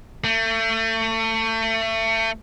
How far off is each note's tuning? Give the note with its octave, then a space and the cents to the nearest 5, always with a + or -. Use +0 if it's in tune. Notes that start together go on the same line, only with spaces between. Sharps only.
A3 +30